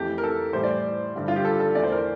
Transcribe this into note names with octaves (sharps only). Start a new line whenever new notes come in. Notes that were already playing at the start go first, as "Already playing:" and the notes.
Already playing: F2 E3 A3 G4
A#4
A4
A2 E3 G3 C5
D5
G2 D3 G3
F4
G4
A4
A4
E2 E3 A3 D5
C5
A#4